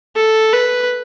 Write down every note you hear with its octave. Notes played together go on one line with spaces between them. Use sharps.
A4
B4